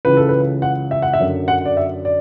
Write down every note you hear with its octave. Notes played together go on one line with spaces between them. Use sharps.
C#2 C#3 E3 B4
A4
B4
F#5
E5
F#5
E5
F#2 D3
F#5
D5
E5
D5